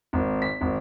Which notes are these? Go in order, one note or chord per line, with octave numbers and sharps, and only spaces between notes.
G#1
B6
G#1